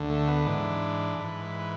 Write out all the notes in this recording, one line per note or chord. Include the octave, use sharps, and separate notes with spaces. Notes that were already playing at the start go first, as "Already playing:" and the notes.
Already playing: D2 D3
A3
B3
G#2 E3 D4
G#2 E3 B4
B4
B4